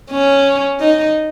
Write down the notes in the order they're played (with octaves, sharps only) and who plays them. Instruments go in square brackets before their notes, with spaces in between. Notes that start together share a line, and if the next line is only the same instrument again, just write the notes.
[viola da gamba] C#4
D#4